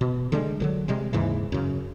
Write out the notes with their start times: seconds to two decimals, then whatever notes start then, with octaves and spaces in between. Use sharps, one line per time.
0.01 B2
0.32 D3 G3 G#3
0.60 D2 D3 F#3
0.88 C3 G3 G#3
1.13 D#2 G#2 C#3 E3
1.52 F#2 C#3